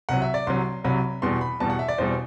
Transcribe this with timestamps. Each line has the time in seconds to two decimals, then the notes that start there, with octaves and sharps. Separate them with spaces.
0.09 C2 C3 F#3 F#5
0.22 E5
0.34 D5
0.47 C2 C3 F#3 C6
0.84 C2 C3 F#3 B5
1.22 E2 B2 G3 C6
1.41 B5
1.60 E2 B2 G3 A5
1.70 F#5
1.79 E5
1.88 D5
1.98 E2 B2 G3 C5